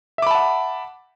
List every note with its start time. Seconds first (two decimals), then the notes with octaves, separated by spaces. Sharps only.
0.18 E5
0.22 D6
0.27 B5
0.31 A5
0.35 F#5